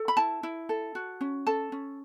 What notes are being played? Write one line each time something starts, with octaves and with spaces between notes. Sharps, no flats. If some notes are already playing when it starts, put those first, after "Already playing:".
Already playing: A4
B5
E4 A5
E4
A4
F#4
C#4
A4 A5
C#4